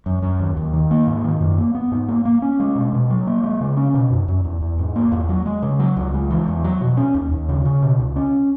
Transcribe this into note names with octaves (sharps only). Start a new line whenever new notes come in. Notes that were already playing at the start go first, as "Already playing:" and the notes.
F#2
F#2
D#2
D#2
D#3
A#3
G#2
D#3
F#2
A#3
B3
G#2
A#3
A#3
C#4
G#3
B2
B2
F#3
A#3
G#3
C#3
C#4
B2
F#2
F#2
E2
E2
G#2
A#3
E2
F#3
G#3
C#3
F#3
C#2
G#3
E3
E2
F#3
B2
C#4
D#2
D#2
C#3
C#3
B2
C#2
C#4